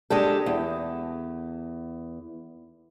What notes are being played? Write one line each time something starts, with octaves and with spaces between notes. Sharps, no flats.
G#3 D4 G4 A4
E2